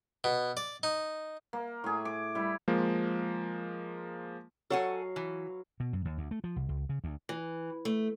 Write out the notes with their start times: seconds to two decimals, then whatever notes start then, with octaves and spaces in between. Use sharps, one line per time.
0.24 B2
0.57 D5
0.83 D#4
1.53 A#3
1.84 A2 G#4
2.05 D6
2.35 G3 E4
2.68 F3 G#3 A#3
4.70 F#3 A4 F5 F#5 G#5 C#6
5.16 E3
5.80 B2
5.93 F#2
6.05 D#2
6.18 D2
6.31 A3
6.44 F3
6.56 C2
6.69 C#2
6.89 C#3
7.04 D2
7.29 E3
7.85 A3